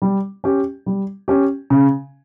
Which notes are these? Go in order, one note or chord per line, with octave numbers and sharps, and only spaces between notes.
G3
C#4 G4
G3
C#4 G4
C#3